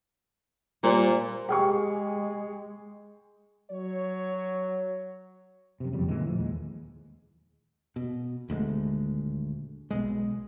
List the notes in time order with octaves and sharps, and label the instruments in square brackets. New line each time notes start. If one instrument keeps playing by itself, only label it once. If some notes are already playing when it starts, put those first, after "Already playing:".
[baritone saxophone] A#2 [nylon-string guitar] G3 C5
[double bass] G#3 [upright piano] G4 G#4 C#6
[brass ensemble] F#3 C#5
[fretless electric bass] F#2 C3
F#1 F2 C#3 G3
A#2 D3 E3 G#3
A2 F3
D#2 G#3
[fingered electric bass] B2
D#1 D2 G3 G#3
B1 B2 G#3